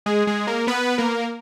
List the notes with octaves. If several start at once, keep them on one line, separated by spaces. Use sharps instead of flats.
G#3 G#4
G#3 G#4
A#3 A#4
B3 B4
A#3 A#4